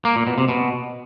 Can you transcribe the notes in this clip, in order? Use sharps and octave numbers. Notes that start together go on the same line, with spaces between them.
A#3
A#2
B2
C3
B2